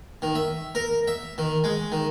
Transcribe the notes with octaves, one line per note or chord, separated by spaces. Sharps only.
D#3
E5
A#4
E5
D#3
G#3
D#3